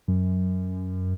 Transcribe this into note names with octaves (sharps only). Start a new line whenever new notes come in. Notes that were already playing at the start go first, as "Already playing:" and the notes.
F#2